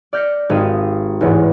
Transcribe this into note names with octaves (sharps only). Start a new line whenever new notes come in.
D5 F6 G6 A#6 B6 C#7
G#1 G4 F5 D#6 D#7
A1 E2 G#2